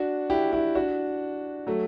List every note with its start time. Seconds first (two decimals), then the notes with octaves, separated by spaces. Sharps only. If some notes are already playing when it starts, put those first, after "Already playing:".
Already playing: D4 F#4
0.30 E4 G4
0.52 E4 G4
0.75 D4 F#4
1.67 F#3 A3